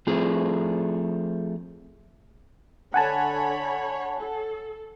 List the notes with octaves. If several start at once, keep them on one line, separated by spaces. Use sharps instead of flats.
F3 A3 C4 F4 G#4
D3 C#5 F#5 G#5 A5 B5
A4